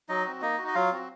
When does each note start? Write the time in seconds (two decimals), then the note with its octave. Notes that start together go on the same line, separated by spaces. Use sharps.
0.09 F#3 D#4 D#5
0.25 C4 F#4
0.42 A#3 D#4 D#5
0.58 F#4
0.63 D#4 D#5
0.75 F#3 F4 F5
0.92 C4 F#4